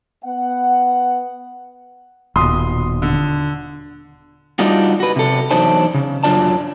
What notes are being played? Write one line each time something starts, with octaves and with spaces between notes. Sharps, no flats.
B3 F#5
D#1 B2 C6 D#6
D3
G3 D4 D#4 F4 F#4
F#4 B4
C3 A4
E2 F#3 D4 D#4 C5 A5
C#3
F#2 F#3 D4 F4 D5 A5